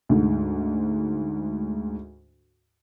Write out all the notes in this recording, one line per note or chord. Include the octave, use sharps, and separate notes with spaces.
D2 G#2